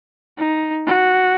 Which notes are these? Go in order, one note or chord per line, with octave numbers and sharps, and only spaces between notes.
D#4
F#4